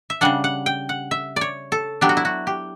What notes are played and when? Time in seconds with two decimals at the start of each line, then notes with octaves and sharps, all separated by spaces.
0.10 E5
0.21 C#3 G3 D4 F#5
0.44 F#5
0.66 G5
0.89 F#5
1.11 E5
1.36 C#5 D5
1.72 A4
2.01 F#3 B3 D4 G4
2.09 F#4
2.17 E4
2.25 F#4
2.47 G4